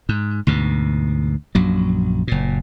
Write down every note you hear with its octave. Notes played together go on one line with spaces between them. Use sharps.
G#2
D2 G#2 B2
A#1 F#2 F#3
F#1 A#2